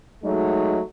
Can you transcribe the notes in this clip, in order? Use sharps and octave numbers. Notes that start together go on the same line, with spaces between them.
F#3 G#3 A3 D#4